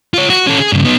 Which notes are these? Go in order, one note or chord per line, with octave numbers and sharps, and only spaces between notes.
F4 C#5
F#4
C#4 A4
G#4
G2 C#3
B3 D#4